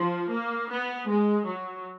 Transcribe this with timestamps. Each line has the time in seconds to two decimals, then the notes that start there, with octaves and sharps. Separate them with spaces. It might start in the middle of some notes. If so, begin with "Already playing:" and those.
Already playing: F3
0.31 A#3
0.70 B3
1.08 G#3
1.46 F#3